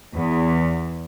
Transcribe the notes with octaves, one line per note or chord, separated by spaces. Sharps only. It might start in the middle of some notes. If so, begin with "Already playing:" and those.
E2